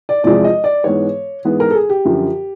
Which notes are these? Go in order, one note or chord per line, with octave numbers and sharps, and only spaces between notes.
D5
E2 C3 F3 G#3 D5
D#5
D5
G#2 E3 G#3 B3 C#5
G#2 E3 G#3 B3
A#4
A4
G#4
G4
F#2 D3 F3